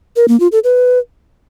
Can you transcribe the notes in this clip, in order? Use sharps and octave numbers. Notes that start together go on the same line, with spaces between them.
A#4
A#3
F4
A4
B4